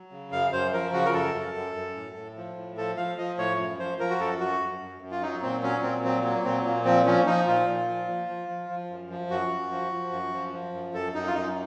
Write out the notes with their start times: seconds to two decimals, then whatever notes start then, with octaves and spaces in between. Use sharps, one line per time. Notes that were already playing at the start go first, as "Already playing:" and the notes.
Already playing: F#3
0.11 C#3
0.32 F#2 F5
0.52 F#2 C5
0.73 F3 A#4
0.93 C#3 F#4
1.05 A#4
1.14 F#2 A4
1.34 F#2
1.54 F#2
1.75 F#2
1.95 A2
2.16 A2
2.37 F3
2.56 A2
2.77 F3 A4
2.97 F3 F5
3.18 F3 D#5
3.38 A2 C#5
3.59 F#2
3.79 F3 C5
3.99 F3 A#4
4.10 F#4
4.20 F#2 A4
4.40 F#2 F#4
4.61 F#2
4.81 F#2
5.01 F#2
5.11 F4
5.22 F#3 D#4
5.42 A#2 C4
5.62 F#3 C#4
5.83 A#2 C4
6.04 F#3 C4
6.24 F#3 A#3
6.44 A#2 C4
6.65 A#2 A#3
6.85 F3 C4
7.06 F3 C#4
7.26 F3 D#4
7.47 A#2 F4
7.68 A#2
7.88 F3
8.08 F3
8.28 F3
8.49 F3
8.69 F3
8.90 F#2
9.10 F3
9.30 F#2 F#4
9.51 F#2
9.71 F3
9.92 F3
10.12 F#2
10.32 F3
10.53 F3
10.74 F#2
10.94 F#2 A4
11.14 F#2 D#4
11.27 F4
11.34 F#2 D#4